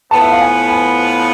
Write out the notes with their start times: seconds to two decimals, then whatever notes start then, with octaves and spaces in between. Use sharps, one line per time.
0.11 A2 F3 B3 A5
0.22 E5
0.32 F5
0.41 G#5
0.69 G#5